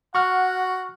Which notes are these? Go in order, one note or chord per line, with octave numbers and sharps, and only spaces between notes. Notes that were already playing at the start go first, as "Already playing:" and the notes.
F#4 F#5 C#6 F6